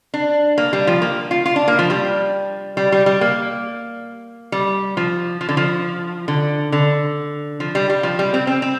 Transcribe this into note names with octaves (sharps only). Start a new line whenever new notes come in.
D4
A#3
G3
F3
A#3
F4
F4
D4
A#3
F3
G3
G3
G3
G3
A#3
G3
F3
F3
D3
F3
D3
D3
F3
G3
G3
F3
G3
C4
C4
C4